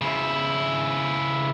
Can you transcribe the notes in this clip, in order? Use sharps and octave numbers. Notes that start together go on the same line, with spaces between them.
C#3 E4